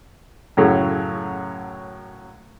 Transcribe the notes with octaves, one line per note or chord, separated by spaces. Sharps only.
F#2 A2 C#3 F#3 G#4 A4